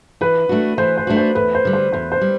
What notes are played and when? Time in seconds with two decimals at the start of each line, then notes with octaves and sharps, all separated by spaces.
0.21 E3 B4
0.49 A3 D4 F#4
0.78 E3 C5
0.97 C5
1.07 A3 D4 F#4
1.17 C5
1.35 E2 B4
1.55 C5
1.65 D3 G3
1.73 C5
1.93 E2 C5
2.12 C5
2.21 G3